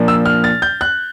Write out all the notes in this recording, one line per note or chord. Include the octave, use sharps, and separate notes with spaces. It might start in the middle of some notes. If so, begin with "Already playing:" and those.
Already playing: A#2 F3 A#3 D4
E6
F6
A6
G6
F#6